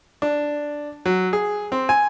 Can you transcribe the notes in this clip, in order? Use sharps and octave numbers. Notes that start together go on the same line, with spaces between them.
D4
F#3
G#4
C4
G#5